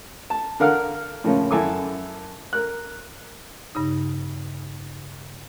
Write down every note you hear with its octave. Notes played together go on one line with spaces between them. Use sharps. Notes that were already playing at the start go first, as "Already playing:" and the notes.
A5
D3 A#4 F5 F#5 F6
A2 C#3 F3 A#3 C#4 F4
F#2 E4 A4 G#5 D6
A#4 F#6
G2 C#3 D#4